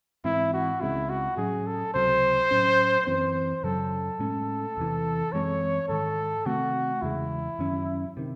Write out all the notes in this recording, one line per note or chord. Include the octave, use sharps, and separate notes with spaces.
G#2 E3 C4 E4
F#4
C#2 C#3 G#3 C4 E4
F#4
A2 F#3 C#4 G#4
A4
C#2 C3 F#3 C5
A2 F#3 C#4
F#2 E3 C4 C5
F#2 C#3 F#3 A4
A2 G#3 C#4
E2 C3 E3
F#2 E3 G#3 C4 C#5
G#2 D#3 G#3 A4
C3 D#3 A3 C4 F#4
E2 C#3 G#3 E4
F#2 D#3 F#3 C#4
C3 D#3